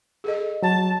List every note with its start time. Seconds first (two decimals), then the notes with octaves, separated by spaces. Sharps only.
0.24 G#4 A4 D#5
0.63 F#3 A5